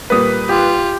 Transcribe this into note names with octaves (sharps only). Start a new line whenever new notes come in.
A#2 G3 A#3 B4 D#6
F4 G4